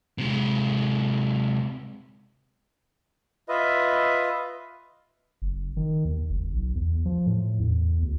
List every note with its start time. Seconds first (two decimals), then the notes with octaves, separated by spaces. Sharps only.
0.18 C3 G#3
3.49 F4 B4 D#5 E5
5.42 F#1
5.77 D#3
6.05 D#2
6.30 F#1
6.54 B1
6.75 E2
7.06 F3
7.26 A2
7.60 E2
8.02 D2